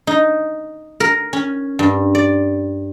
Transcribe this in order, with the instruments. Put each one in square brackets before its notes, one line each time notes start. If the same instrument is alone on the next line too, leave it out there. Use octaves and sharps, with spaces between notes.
[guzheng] D#4
A#4
C#4
G2
D5